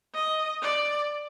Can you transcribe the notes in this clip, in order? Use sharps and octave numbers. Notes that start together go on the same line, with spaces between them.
D#5
D5